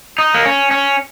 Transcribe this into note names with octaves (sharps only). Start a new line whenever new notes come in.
D#4
A#3
C#4
C#4